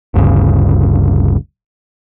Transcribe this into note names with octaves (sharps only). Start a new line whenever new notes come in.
G1 D2 G2 C#3